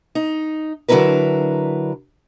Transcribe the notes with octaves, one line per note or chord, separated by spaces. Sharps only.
D#4
D3 F#3 D4 E4 A#4 B4